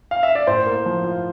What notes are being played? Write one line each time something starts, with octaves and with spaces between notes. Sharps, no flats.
F5
E5
D5
A2 C5
A#3
F3
F4